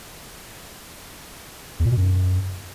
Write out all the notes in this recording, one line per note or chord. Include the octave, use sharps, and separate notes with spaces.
E2
A#2
B2
F#2